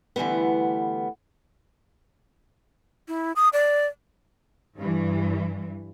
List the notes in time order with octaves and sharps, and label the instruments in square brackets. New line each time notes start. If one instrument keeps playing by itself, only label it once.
[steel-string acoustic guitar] D3 E3 G3 A3 B3
[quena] E4
D#6
D5
[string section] G2 E3